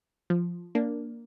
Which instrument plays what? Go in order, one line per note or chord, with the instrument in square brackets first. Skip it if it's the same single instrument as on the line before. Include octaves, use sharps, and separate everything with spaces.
[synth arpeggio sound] F3
A#3 D4